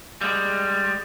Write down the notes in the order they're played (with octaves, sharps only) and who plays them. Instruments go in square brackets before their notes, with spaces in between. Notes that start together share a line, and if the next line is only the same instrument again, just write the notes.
[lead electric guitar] G3 G#3